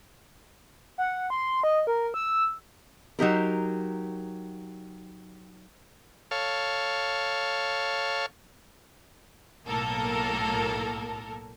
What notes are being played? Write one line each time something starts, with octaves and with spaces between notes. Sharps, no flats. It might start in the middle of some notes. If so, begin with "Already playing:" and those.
F#5
C6
D#5
A#4
E6
F#3 D#4 G4 A#4
A4 C#5 F5
B1 A2 A#3 A4 A#4